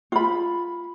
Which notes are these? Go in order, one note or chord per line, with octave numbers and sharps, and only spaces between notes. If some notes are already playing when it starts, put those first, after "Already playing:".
F4 B5